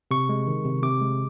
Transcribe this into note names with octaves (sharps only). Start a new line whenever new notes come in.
C3 C#6
G#3
D#3
C3
C3 D6
G#3